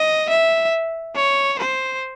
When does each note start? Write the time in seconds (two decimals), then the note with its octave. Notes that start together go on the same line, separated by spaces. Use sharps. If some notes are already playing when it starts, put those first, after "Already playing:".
Already playing: D#5
0.29 E5
1.16 C#5
1.59 C5